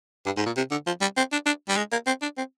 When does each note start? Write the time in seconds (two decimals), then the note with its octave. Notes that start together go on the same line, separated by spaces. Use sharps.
0.26 G2
0.37 G#2
0.46 A#2
0.56 C3
0.71 D3
0.87 F3
1.01 G3
1.17 C4
1.32 D4
1.46 D4
1.69 G3
1.77 G#3
1.92 A#3
2.07 C4
2.22 D4
2.37 C4